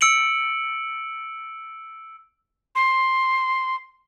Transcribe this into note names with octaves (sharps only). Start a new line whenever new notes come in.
E6 C#7 D7 F#7
C6